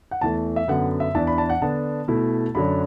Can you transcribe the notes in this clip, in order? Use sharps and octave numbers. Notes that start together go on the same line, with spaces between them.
F#5
E2 E3 A3 A5
E5
F#2 D3 B3 F#5
E5
E2 E3 D4 A5
B5
A5
F#5
D3 B3 D4 A5
B2 A3 E4
F#2 D3 F#3 D4 B5